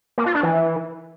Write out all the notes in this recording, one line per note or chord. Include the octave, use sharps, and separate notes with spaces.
A#3
F4
D4
E3